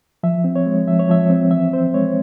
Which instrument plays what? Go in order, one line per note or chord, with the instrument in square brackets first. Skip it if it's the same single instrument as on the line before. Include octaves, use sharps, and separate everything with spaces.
[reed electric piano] F3 E5
C4
C#5
G#3
F3 E5
C#5
F3 E5
C4
E3 E5
C4 C5
G#3 C#5